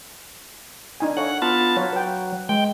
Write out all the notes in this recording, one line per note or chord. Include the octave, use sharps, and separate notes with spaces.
D4 D#4 G#5
A4 C#5 F5 F#5
B3 F4 A5
F#3 C#5 F5
B4 G5
G#3 G5